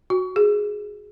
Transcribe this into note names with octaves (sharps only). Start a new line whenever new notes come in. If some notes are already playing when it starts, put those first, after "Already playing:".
F#4
G#4